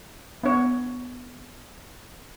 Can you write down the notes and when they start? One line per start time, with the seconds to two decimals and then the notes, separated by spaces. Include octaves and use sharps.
0.43 B3 D4 C#5